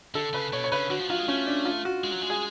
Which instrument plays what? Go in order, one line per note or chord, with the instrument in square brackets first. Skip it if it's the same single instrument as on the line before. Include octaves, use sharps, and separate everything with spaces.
[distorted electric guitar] D3 [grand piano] A4
[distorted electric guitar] C#3 [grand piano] B4
[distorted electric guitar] B2 [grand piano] C#5
[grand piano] C#5
[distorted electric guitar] C#3 [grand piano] B4
[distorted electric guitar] D3 [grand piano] F#4
[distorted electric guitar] F3
[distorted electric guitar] F#3 [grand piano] F4
[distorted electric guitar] G#3
[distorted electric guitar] A3 [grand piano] C#4
[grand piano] D4
F4
F#4
[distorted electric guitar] G#3
F#3
G#3
[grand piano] G#4